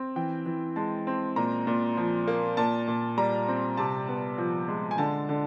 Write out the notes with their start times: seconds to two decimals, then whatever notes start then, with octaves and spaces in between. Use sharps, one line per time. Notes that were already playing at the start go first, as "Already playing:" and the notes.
Already playing: C4
0.16 E3 G5
0.46 E3
0.76 G#3 A5
1.07 C4
1.36 A#2 A#5
1.67 A#2
1.97 F3
2.27 A#3
2.57 A#2 A5
2.88 A#2
3.17 G3 A#5
3.48 C4
3.77 C3 A5
4.09 B3
4.38 F3
4.68 G#3
4.91 G#5
4.98 D3 A5
5.29 D3